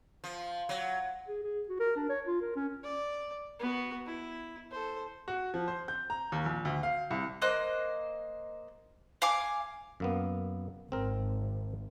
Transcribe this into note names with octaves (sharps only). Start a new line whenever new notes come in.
F3
F#3
G#4
G#4
F#4
A#4
D4
C#5
F4
A#4
C#4
D5
B3 F#4
E4
A4 C5
F#4
F3
C5
G6
A#5
D#2
A#1
D2
F5
C2
A#3 C5 D#5 F#6
F5 G#5 D6
F#2 A#3 B3
G#1 C4 A#4